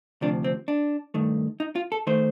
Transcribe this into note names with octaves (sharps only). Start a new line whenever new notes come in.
D2 C3 F3 D4
C4
D4
G2 D#3 A3
D#4
F4
A4
D#3 A3 C5